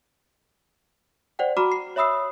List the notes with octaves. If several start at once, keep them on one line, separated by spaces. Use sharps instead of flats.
C5 D5 F#5 G5
F#4 A#5 B5 D6 F6
C7
C#5 E5 B5 D#6 E6 C7